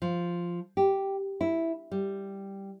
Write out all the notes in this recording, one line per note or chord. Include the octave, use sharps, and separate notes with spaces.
F3
G4
E4
G3